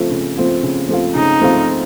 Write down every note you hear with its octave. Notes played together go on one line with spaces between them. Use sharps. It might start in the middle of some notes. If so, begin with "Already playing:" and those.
Already playing: C#3 F3 A3 C4 F4
C#3
F3 A3 C4 F4
C#3
F3 A3 C4 F4
C#3 D#4
F3 A3 C4 F4